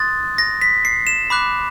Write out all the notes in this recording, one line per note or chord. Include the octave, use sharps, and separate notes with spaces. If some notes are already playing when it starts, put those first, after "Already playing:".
Already playing: C6 D#6 F#6 A6
A#6
B6
C7
E7
B5 D6 F#6